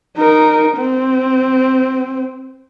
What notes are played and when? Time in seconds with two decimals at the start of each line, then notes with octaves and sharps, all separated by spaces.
0.17 D#4 A#4
0.77 C4